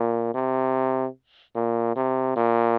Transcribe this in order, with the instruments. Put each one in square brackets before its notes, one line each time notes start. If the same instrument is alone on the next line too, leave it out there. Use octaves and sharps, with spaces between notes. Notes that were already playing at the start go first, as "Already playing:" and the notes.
Already playing: [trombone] A#2
C3
A#2
C3
A#2